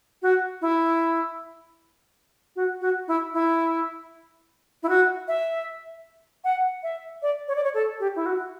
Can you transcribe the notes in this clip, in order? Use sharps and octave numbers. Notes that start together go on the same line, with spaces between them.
F#4
E4
F#4
F#4
E4
E4
E4
F#4
E5
F#5
E5
D5
C#5
D5
C#5
A4
G4
E4
F#4